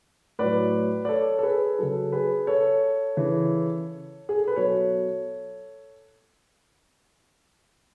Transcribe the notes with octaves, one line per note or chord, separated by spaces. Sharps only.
A2 F#3 B4 D5
D5
A4 C#5
A4
G#4 B4
C#3 F#3 A4
G#4 B4
A4 C#5
C#3 E3
G#4
A4
B4
B2 F#3 A4 C#5